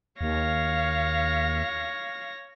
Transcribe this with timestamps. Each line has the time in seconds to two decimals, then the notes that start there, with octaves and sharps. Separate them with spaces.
0.21 D#2 C#5 F5 A#6